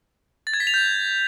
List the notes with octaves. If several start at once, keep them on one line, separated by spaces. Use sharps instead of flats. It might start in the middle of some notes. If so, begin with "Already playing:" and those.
A6
G#6
B6
F7
G6